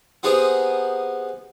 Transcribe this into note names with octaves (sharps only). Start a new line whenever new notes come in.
B3 C4 D#4 G4 G#4